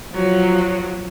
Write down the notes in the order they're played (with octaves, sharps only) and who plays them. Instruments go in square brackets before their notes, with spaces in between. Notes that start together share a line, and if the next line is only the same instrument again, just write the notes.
[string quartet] F3 F#3